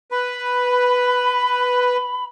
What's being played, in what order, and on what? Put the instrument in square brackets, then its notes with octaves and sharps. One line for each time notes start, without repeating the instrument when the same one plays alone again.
[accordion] B4 [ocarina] B5